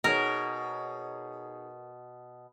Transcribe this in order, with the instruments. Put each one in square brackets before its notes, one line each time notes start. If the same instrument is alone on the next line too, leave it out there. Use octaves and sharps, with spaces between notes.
[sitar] B2 [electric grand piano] D#4 G#4 C#5 [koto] A#4